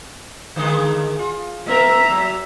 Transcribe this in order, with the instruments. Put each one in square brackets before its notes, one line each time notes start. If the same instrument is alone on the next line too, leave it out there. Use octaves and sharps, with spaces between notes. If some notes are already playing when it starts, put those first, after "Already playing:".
[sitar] D3 D#3 G#3
F4
[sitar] B3 A#4 [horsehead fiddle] E5 A#5
[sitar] F#3